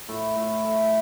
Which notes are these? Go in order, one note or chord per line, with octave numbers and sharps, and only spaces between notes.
A2
A2
A3